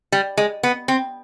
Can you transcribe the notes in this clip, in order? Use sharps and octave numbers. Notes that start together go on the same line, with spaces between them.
G3
G#3
B3
C4